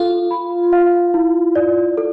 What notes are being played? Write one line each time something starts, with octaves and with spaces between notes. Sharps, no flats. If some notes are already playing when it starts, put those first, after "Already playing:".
Already playing: F4 A4
B5
F5
E4
D5
A4